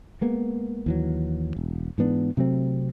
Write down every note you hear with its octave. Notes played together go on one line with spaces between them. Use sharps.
G#3 A#3 B3
D#2 E3 F#3
E1
G#2 E3 B3 D4
C3 F#3 A3 C4